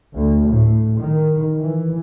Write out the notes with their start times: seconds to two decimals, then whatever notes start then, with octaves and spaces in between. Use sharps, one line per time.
0.15 D2
0.48 A2
0.98 D#3
1.61 E3